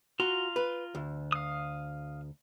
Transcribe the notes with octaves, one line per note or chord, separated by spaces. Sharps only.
F4 F#4 A#5 C6
B4
D2
F5 D#6